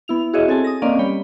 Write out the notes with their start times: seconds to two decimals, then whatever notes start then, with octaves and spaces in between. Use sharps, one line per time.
0.08 B3 E4 F7
0.33 E4 F#4 G#4 C#5 D#5 E5
0.48 C4 G#4 A4 G#5 A5
0.64 D#6 A#6
0.82 A#3 C4 C#4 D5 D#5 F5
0.99 G3 C#5 G5 B5